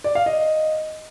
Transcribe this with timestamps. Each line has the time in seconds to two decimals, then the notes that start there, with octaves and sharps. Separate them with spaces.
0.04 D5
0.15 F5
0.26 D#5